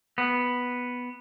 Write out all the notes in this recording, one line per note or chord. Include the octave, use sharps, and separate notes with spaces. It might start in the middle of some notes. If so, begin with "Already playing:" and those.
B3